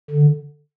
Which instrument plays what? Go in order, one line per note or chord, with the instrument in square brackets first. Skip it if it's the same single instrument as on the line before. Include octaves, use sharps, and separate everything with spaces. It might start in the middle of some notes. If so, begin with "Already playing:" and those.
[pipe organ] D3